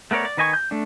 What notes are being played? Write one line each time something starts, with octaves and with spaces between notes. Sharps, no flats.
A3 B3 A#4 C#5 D5
D5
D#3 B4 D#5 G#5 C#6
G6
A3 D4